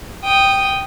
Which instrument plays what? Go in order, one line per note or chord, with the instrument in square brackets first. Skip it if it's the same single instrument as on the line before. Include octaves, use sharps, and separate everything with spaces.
[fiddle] G5 D#6